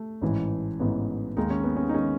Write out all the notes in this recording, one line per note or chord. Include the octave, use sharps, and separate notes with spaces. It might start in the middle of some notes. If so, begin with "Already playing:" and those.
Already playing: A3
A1 G#2 E3
A1 G#2 E3 B3
D#2 D#3 G#3 D#4
C#4
B3
C#4
D#4
D#3 G#3 C#4